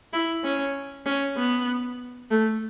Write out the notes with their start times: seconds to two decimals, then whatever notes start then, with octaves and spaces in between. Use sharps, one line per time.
0.13 E4
0.44 C#4
1.06 C#4
1.37 B3
2.31 A3